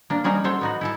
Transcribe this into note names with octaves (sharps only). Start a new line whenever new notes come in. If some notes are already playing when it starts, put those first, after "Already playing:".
A#3 D4
G3 C#4 D#4 G#4 A#4
F#3 A4 C5 C#5
B3 D#4 F#4
E4 A4 A5